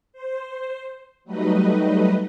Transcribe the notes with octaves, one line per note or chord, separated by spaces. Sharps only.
C5
F#3 G3 A3 D#4 B4 D#5